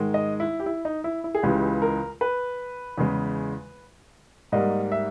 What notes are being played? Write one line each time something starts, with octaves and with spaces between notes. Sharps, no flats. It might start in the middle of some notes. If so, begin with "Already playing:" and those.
Already playing: G#2 D#3 G#3
D#5
E4
G4
E4
D#4
E4
E4
G#4
C#2 C#3 E3 G#3 G4
A#4
B4
E2 C#3 G#3
G#2 G3 A#3 D#5
E5